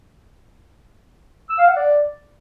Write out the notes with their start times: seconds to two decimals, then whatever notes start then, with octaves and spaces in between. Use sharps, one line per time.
1.49 E6
1.58 F5
1.67 F#5
1.76 D5